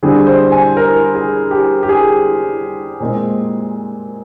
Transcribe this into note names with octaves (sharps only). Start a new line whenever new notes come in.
D3 G3 C4 G#4
C5
G#5
A#4
G#4
G4
G4
G#4
A#2 G#3 C4